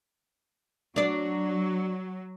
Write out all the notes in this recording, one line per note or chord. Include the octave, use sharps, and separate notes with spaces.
F#3 D4 D5